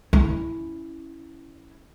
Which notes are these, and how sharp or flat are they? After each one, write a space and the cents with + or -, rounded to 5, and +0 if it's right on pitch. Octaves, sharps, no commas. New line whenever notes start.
C#4 +0 E4 +0